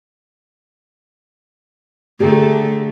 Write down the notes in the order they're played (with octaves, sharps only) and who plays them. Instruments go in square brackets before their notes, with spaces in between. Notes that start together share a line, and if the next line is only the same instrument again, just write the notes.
[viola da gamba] D3 A3 [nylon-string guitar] G4 G#4 A#4